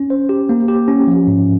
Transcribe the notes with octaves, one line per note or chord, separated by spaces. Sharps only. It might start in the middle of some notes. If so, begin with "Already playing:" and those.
Already playing: C#4
C5
G4
A#3
G4
C#4
F3
G#2